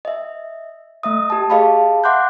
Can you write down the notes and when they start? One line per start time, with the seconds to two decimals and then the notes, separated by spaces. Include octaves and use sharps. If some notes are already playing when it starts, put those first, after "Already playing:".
0.05 D#5 E5
1.03 A3 E5 D#6
1.30 G4 A5
1.50 G#4 D#5 F5 A5 B5
2.04 E5 F#5 C6 D6 F#6 G6